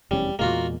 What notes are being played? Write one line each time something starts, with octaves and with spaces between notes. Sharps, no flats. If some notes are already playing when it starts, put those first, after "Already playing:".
F1 E2 G3 C#4
E2 A#2 G#3 A#3 F4 F#4